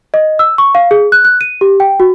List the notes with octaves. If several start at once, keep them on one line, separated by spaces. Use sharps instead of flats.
D#5
E6
C#6
F5
G#4
F#6
F#6
D#7
G4
G5
F#4